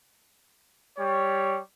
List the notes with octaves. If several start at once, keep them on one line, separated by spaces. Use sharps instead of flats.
G3 C#5